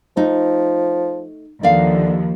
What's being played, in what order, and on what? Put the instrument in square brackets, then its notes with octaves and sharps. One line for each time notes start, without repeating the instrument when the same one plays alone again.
[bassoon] F3 [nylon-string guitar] A3 D#4
[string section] D#2 F3 [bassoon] D3 [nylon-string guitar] D5 E5 F5